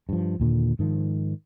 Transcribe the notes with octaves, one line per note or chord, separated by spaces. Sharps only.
G2 F3
D#2 A#2 D3
G#2 D#3 F3